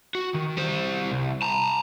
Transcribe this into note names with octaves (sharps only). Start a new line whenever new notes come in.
F#4
D#3
G3 C5
C2
A5 A#5